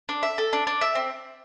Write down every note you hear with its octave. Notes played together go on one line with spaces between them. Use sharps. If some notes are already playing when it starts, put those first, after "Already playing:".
D4
E5
A4
D4
D4
E5
C4